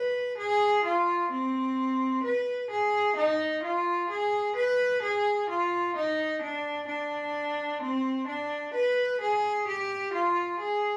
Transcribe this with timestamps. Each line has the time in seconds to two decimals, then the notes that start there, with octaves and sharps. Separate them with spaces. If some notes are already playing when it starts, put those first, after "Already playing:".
Already playing: B4
0.38 G#4
0.84 F4
1.30 C4
2.24 B4
2.70 G#4
3.16 D#4
3.63 F4
4.10 G#4
4.56 B4
5.02 G#4
5.49 F4
5.96 D#4
6.42 D4
6.88 D4
7.82 C4
8.27 D4
8.74 B4
9.21 G#4
9.68 G4
10.13 F4
10.60 G#4